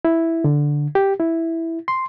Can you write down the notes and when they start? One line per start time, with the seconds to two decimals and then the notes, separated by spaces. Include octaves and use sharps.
0.05 E4
0.44 D3
0.95 G4
1.20 E4
1.88 C6